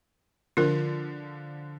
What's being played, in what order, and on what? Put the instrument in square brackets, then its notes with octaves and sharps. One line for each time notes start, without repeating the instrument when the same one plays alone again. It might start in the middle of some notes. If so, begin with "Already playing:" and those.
[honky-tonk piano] D3 F3 [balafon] F4 A#4